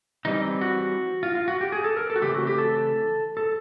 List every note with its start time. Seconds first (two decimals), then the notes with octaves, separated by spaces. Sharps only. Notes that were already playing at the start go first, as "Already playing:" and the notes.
0.25 E3 G3 C4 D#4
0.61 F#4
1.23 F4
1.35 F4
1.48 F#4
1.61 G4
1.72 G#4
1.84 A4
1.97 A#4
2.10 A4
2.16 F#4
2.22 C#3 E3 A3 C4 G4
2.35 F#4
2.47 G4
2.58 A4
3.37 A4